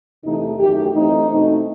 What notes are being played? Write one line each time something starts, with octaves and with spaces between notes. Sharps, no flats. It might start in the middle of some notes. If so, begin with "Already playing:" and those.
E2 C3 E3 A3 D#4
F#2 D#3 A3 D#4 G4
G2 E3 A3 C4 D#4
B2 A3 C4 D#4